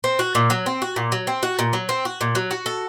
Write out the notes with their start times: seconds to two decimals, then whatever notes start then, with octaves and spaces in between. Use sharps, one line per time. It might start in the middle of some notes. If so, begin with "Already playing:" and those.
0.04 C4
0.19 F#4
0.35 A#2
0.50 F#3
0.66 C4
0.82 F#4
0.96 A#2
1.12 F#3
1.27 C4
1.43 F#4
1.59 A#2
1.73 F#3
1.89 C4
2.05 F#4
2.21 A#2
2.35 F#3
2.51 F#4
2.66 A4